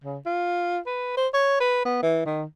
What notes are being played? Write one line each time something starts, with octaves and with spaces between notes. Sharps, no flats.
C#3
F4
B4
C5
C#5
B4
B3
E3
D#3